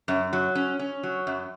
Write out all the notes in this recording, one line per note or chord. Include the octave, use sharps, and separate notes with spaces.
F#2
F#3
C#4
C#4
F#3
F#2